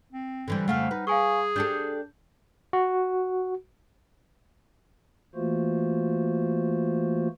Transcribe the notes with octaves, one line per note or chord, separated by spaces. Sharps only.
C4
D3 E3 G3
F2 C#3 A3 F5 F#5 F6
D#4 B4
G#4 F5 G#5 C#6
D4 G4 A4 G6
F#4
E3 A3 A#3 F4 F#4 C5